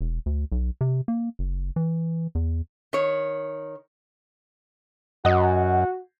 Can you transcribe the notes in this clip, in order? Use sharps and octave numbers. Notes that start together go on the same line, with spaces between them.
E1
D2
B1
C3
A#3
F#1
E3
E2
D#3 C#5
F#2 F#4 D#5 F#5